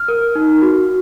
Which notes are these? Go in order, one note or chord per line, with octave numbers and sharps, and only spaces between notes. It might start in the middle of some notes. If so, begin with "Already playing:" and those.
Already playing: F6
A#4
D#4
F#4